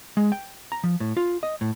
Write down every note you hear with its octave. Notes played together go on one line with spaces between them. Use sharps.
G#3
G5
A#5
F3
A2
F4
D#5
A2